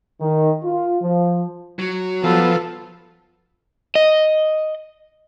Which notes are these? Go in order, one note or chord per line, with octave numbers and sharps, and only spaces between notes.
D#3
F4
F3
F#3
F3 B3 A4 B4
D#5